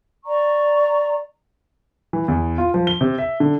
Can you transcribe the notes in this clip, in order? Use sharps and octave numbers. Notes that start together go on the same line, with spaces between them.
D5 A#5 C#6
E3
E2
F4
F3
G7
C3
E5
D3